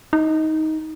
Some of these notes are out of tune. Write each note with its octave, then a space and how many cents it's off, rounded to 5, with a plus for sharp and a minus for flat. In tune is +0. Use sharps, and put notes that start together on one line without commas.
D#4 +15